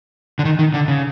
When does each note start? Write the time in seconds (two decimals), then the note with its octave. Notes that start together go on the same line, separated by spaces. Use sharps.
0.39 D3
0.45 D#3
0.59 D#3
0.74 D3
0.88 C#3